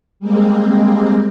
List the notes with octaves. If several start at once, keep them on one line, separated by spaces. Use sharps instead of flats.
G3 G#3 A#3 C4